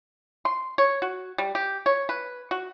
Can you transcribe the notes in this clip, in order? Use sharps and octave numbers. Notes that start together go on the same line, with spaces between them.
C6
C#5
F#4
G3
G4
C#5
B4
F#4